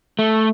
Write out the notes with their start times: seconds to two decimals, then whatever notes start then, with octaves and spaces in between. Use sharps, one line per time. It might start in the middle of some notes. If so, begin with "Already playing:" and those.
0.19 A3